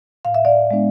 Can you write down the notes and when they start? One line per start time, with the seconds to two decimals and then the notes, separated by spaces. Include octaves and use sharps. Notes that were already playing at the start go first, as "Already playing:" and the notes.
0.25 A2 F5
0.34 E5
0.45 D5 F5
0.71 G#3 B3 D4